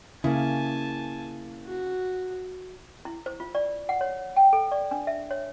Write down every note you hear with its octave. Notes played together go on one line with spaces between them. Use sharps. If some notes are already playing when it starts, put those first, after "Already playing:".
C#3 A#3 E4 G#5 A5
F#4
E4
C5
F4
D5
F#5
C#5
G5
A4
D5
D4
E5
C#5